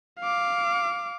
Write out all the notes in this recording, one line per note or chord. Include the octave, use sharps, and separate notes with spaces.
F5 D6